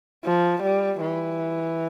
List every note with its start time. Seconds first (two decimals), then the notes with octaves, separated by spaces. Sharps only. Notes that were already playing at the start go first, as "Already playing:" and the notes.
0.25 F3
0.63 G3
1.01 E3